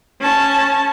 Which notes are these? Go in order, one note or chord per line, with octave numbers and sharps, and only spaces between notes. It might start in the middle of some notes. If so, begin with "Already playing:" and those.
C#4 A5